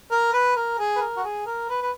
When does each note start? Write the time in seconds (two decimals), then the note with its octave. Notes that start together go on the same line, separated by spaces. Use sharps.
0.11 A#4
0.33 B4
0.56 A#4
0.78 G#4
0.96 B4
1.00 A#4
1.17 F#4
1.24 G#4
1.46 A#4
1.69 B4
1.82 B4